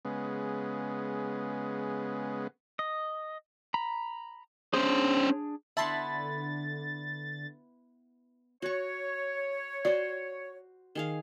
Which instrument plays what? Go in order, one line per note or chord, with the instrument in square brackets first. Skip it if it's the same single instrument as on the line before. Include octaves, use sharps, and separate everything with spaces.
[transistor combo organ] C#3 G#3 B3
[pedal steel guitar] D#5
A#5 B5
[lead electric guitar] C#4 C5 [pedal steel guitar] D4 G#4
[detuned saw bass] D3 [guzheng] B3 E4 [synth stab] E5 A5 C6 [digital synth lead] A6
[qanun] F#4 C#6 [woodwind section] C#5
[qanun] F#4 C5 [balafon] D5
[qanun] D#3 G#4 F5